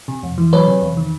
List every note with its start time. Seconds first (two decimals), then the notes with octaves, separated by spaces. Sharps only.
0.08 C3
0.23 F2
0.38 E3
0.53 F#3 B4 C#5
0.67 C3
0.82 E2
0.97 D#3